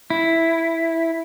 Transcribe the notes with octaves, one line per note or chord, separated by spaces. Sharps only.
E4